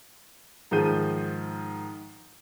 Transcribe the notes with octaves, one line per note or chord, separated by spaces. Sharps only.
G#2 D#3 F3 G#3 G6 D#7